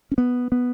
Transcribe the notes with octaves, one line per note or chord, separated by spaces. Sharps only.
C#4
B3
B3